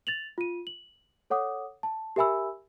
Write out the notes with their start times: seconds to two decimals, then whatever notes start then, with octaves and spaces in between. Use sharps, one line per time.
0.07 A6 F7 F#7
0.38 F4 D#7
0.67 F#7
1.30 A4 C#5 F#5 D6 D#6
1.83 A5
2.16 G4 A#4 E5 G#5 B5 E6